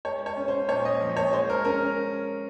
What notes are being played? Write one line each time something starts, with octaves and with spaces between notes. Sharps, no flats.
G#3 C#5
C#5
C#4
C5
A#2 C#5
D#5
F3
C#5
G#3 C5
A#4
C#4 A#4